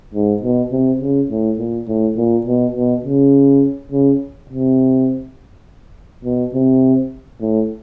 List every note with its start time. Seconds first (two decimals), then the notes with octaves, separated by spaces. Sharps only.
0.14 G#2
0.43 B2
0.72 C3
1.01 C#3
1.31 A2
1.59 A#2
1.88 A2
2.17 A#2
2.47 B2
2.76 B2
3.05 C#3
3.92 C#3
4.50 C3
6.25 B2
6.54 C3
7.41 A2